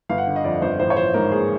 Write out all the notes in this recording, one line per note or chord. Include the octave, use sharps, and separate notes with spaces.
G1 F5
F#5
D3
D#5
F2 D5
G1 C5
A1 C5
C#5
F3 C5
G#2 A#4
A#3 G#4